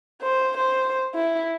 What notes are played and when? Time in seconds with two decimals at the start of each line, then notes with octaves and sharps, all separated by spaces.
0.22 C5
0.57 C5
1.15 E4